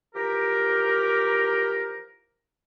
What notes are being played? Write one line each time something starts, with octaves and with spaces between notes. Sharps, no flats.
E3 F3 G4 A#4